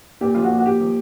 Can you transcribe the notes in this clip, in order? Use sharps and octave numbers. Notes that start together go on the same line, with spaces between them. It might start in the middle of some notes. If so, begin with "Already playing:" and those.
A#2 G4
F3 F4
F#4
A#2
F#4
A#2 G4
F3